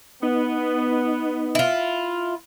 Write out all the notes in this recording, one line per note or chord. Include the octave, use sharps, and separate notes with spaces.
B3 D#4
E4 F4